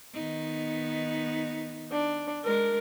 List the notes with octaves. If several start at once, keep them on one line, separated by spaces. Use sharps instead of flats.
D#3 B3 D#4
D4
G#3 D4 A#4